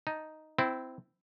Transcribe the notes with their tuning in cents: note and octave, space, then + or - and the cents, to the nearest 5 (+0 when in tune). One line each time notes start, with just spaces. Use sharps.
D#4 +0 A5 +0
C4 -15 E4 +0